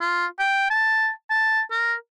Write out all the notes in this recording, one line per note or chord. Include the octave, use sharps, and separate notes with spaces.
F4
G5
A5
A5
A#4